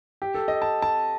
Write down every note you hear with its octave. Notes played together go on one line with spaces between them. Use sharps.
G4
A4
D#5
A5
A5